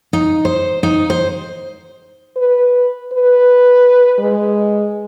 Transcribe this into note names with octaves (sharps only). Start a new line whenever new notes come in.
D#4
C5
D#4
C5
B4
B4
G#3